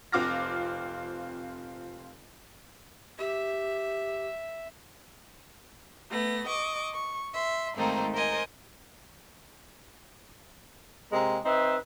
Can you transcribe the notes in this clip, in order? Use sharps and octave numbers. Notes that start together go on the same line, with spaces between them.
F1 C4 F4 D6 F6 A#6
G4 E5
A3 B3 A#6
D#5 C#6 D6
C#6
E5 C6
G#2 D#3 A3 A#3 C4 D#4
A#4 C5 D#5 G#5
C3 G#3 A#3 A#5
C4 D#4 B4 E5